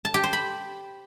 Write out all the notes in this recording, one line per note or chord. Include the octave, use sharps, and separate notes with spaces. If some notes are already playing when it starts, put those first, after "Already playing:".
A5
G4
C5
B5